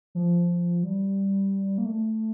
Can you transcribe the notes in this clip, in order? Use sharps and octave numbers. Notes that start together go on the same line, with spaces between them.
F3
G3
A#3
A3